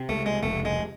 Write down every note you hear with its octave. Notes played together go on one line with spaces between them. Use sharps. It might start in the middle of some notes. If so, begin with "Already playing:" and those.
Already playing: C3
C#2 A3
G#3
F1 A3
G#3